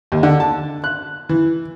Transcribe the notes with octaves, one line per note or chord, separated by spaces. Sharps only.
D#2
D3
A5
F#6
E3